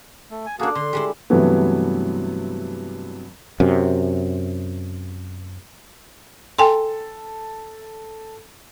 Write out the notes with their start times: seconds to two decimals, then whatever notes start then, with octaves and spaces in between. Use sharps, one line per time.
0.30 A3
0.46 G#5
0.59 A#3 D4 F#4 G#4 A4
0.75 D3 C6
0.93 G3 G#3 E4
1.30 G2 C3 E3 F#3 A3 B3
3.60 F#2 C3
6.58 A4 G5 G#5 C6